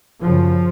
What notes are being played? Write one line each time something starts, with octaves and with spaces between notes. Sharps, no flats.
F#2 C#3 F3